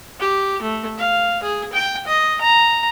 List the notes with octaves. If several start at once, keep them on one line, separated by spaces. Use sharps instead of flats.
G4
A3
F5
G#4
G5
D#5
A#5